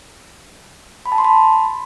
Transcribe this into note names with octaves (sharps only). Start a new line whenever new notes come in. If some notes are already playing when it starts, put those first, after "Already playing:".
B5
A5
C6
B5